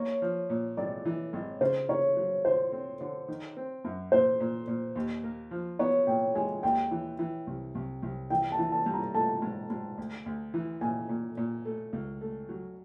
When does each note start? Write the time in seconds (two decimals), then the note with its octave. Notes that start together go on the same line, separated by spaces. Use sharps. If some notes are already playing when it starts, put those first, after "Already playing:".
Already playing: A#3 C#5
0.22 F3
0.50 A#2
0.77 G#1 D5
1.05 E3
1.33 G#1
1.61 C#3 C5
1.89 C#3 C#5
2.17 F#3
2.45 D3 C5
2.72 C4
3.01 D3
3.28 D#3
3.57 C4
3.85 F#2
4.12 A#2 C5
4.40 A#2
4.68 A#2
4.96 D#2
5.24 A#3
5.51 F3
5.79 B3 C#5
6.07 A#2 G5
6.35 G#3 G#5
6.63 D#2 G5
6.91 E3
7.19 E3
7.47 C2
7.75 C2
8.03 C2
8.30 E3 G5
8.52 A5
8.58 E3
8.72 A5
8.86 G2
8.94 A#5
9.14 A3 A5
9.42 G#2
9.70 G#2
9.98 D2
10.26 D2
10.54 E3
10.81 A#2 G#5
11.09 A#2
11.37 A#2
11.65 A3
11.93 C#2
12.21 A3
12.49 F#3